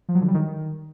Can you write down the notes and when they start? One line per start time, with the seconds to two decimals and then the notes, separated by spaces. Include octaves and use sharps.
0.09 F3
0.15 F#3
0.22 D3
0.28 G3
0.34 D#3